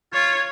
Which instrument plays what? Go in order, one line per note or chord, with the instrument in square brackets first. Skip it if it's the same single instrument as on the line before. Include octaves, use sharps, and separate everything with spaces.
[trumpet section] F4 [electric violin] C#5